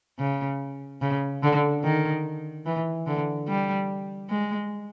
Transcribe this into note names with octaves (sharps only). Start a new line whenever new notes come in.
C#3
C#3
D3
D#3
E3
D3
G3
G#3